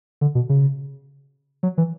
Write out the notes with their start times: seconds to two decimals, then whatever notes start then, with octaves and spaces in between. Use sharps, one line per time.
0.21 D3
0.35 B2
0.49 C#3
1.63 F#3
1.78 E3